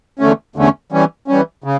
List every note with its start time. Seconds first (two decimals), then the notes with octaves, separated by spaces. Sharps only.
0.19 E2 D3 A3 C#4
0.56 E2 D3 A3 C#4
0.92 E3 G3 C#4
1.28 E3 G3 C#4
1.64 C#3